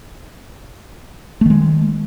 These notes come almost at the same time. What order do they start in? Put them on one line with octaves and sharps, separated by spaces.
A3 D#3 G#3